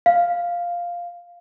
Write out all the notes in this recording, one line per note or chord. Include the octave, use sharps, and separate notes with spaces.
F5